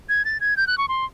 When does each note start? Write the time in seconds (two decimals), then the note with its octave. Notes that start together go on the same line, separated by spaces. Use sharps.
0.09 G#6
0.25 A6
0.40 G#6
0.57 G6
0.67 F#6
0.78 C#6
0.89 C6